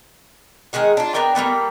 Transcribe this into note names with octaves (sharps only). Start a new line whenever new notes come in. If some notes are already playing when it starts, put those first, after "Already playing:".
D#3 G#3 G#4 F#5
D4 F4
B3 D4 A#4 G5
G3 A#3 B3 A4